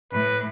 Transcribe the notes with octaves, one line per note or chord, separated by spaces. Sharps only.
A2 B4